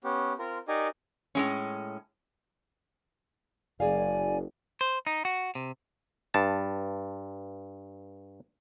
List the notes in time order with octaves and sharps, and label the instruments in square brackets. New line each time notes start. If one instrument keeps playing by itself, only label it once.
[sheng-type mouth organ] B3 C#4 G4
C4 F4 A#4
D#4 G4 A#4 D5 D#5 G#5
[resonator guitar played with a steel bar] A2 G#3 C#4
[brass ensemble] F#1 [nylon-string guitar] G#4 F5 [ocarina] D5 [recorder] G#5
[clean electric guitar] C5
D#4
F#4
C3
[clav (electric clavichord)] G2 A5